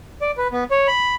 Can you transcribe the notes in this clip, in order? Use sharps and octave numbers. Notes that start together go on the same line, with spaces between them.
D5
B4
B3
C#5
B5